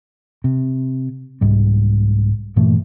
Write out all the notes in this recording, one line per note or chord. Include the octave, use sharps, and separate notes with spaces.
C3
C2 G#2 G3
G2 A#2 E3 A3